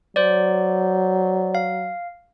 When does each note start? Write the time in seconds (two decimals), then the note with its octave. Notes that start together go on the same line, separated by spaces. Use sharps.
0.16 F#3 C5 D5
1.55 F5